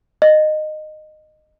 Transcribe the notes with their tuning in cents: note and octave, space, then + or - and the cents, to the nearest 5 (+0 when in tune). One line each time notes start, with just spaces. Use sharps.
D#5 -15